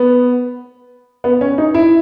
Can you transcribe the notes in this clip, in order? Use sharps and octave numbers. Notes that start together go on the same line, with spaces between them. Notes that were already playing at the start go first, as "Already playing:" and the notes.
Already playing: B3
B3
C#4
D#4
E4